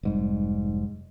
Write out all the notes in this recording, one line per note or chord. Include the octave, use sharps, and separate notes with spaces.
F1 G#2 G3